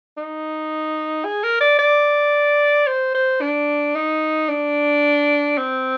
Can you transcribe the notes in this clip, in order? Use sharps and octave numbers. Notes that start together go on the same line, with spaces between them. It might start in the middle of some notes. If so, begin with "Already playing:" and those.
D#4
G#4
A#4
D5
D5
C5
C5
D4
D#4
D4
C4